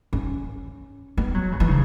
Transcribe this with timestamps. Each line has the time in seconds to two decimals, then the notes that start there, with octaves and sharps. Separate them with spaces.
0.13 C#4
1.17 B3
1.35 F#3
1.52 C#3
1.60 E3
1.68 C#3